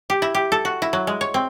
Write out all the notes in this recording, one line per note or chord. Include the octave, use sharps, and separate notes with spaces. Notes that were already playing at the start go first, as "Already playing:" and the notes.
G4
E4
G4
A4
F#4
E4
F#3
G#3
C#5
C4